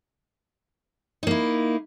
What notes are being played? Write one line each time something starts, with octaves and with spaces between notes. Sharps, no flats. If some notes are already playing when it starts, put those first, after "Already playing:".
A#3 D#4 E4